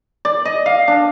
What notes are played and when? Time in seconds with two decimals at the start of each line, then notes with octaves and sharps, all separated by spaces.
0.25 D5
0.45 D#5
0.66 F5
0.88 D4